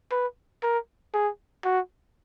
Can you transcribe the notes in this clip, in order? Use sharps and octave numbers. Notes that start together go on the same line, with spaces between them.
B4
A#4
G#4
F#4